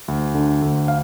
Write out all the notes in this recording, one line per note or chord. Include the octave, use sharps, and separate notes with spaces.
D2
D3
D2
F5